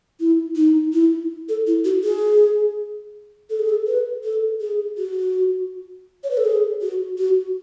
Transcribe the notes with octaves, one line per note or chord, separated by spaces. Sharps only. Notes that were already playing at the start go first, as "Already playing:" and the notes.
E4
D#4
E4
A4
E4
F#4
G#4
A4
G#4
A4
B4
A4
G#4
F#4
C#5
B4
A4
G#4
F#4
F#4